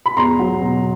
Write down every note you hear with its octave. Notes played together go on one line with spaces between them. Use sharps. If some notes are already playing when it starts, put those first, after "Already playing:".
B5
E2 A#5 C6
F#3
B2